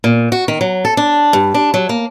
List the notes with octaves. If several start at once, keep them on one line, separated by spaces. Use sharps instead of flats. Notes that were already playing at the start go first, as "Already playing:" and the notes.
A#2
F#4
D#3
F#3
A4
D4
G2
D4
F#3
A#3